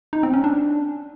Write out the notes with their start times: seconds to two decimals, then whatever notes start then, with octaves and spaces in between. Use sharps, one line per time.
0.13 D#4
0.23 C4
0.34 C#4
0.44 D4